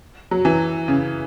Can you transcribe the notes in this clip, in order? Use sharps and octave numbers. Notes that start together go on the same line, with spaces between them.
F#3
E3
C#3